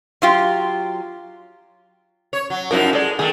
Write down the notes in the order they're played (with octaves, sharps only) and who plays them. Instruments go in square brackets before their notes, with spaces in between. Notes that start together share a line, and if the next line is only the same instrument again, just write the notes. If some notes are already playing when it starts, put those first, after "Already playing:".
[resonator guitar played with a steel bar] F#3 F4 G4
[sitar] C#5
F#3
[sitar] F#2 F3 D#4 [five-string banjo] E4 F#4 A#4
[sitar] G#3 [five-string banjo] A4 D5
[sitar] D#3 A3 [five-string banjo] G#4 A4